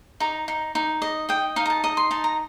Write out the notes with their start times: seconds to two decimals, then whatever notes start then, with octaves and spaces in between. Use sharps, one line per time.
0.20 D#4 A#5
0.48 D#4
0.75 D#4
1.02 D#5
1.29 D#5 G5
1.56 D#4 F5
1.66 A#5
1.70 A5
1.84 D#5 A#5
1.97 C6
2.11 D#4 A5
2.24 A#5